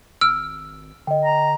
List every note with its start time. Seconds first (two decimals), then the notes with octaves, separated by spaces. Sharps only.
0.21 G#1 E6 F6 D7
1.07 D3 D#5 G5
1.25 A#5